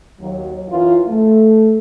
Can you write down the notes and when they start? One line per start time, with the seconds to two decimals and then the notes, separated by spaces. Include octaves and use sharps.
0.19 D#2 F#3
0.68 F#2 E3 E4 F4
1.07 A3